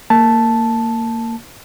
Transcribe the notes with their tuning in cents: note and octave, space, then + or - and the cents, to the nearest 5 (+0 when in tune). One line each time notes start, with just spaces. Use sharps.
A#3 -20 A5 +0